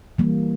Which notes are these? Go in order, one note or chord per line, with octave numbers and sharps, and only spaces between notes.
E3 G3 A#3